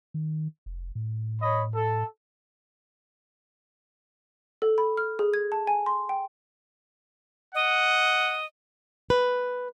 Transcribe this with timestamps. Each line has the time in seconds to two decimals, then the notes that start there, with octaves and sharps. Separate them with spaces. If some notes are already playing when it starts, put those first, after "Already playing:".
0.14 D#3
0.66 F1
0.95 A2
1.42 C#5 D#5 B5
1.75 A4
4.62 A4
4.78 B5
4.97 F6
5.19 G#4
5.34 G#6
5.52 A5
5.67 G#5
5.86 C6
6.09 G5
7.54 D#5 F#5
9.10 B4